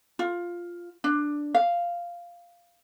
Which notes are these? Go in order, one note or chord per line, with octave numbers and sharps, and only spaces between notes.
F4
D4
F5